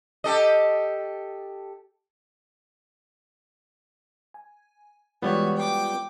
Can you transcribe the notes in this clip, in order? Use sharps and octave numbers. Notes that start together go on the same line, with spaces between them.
G4 A4 D#5
G#5
E3 G3 G#3 B3 F4 F#4 C#5
G5 D6